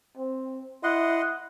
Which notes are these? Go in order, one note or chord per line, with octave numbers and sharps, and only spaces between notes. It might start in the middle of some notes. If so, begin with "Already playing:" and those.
C4
E4 D#5 F#5 C6